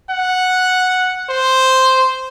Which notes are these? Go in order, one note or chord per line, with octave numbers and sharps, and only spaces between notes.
F#5
C5